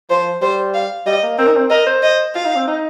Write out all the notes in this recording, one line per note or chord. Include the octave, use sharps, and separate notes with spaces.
F3 C5
G3 C5
F5
G3 D#5
A#3
C4 A#4
D#4
C4
A#4 D#5
C5
D#5
F4 F5
D#4
C4
D#4